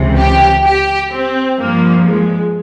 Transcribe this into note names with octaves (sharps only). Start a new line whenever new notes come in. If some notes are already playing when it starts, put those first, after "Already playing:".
Already playing: C#2 C3 E3
G4
G4
C4
G2 F3 A#3
G#3